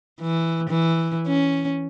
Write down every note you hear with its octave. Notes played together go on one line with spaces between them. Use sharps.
E3
E3
C#4